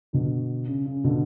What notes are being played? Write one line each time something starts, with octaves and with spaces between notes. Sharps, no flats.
B2 D3
C#3
C#3
B2 D3